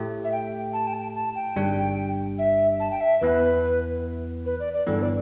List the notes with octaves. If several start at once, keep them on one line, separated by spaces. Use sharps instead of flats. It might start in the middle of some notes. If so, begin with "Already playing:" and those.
Already playing: A2 A3 G4
E5
G5
A5
G5
A5
A5
G5
G1 G2 G3 D4
E5
A5
G5
E5
E2 E3 B3 B4
B4
D5
D5
G1 G2 E3 B3 A4
D5